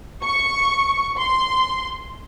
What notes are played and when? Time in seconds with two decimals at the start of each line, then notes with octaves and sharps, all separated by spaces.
0.23 C#6
1.18 C6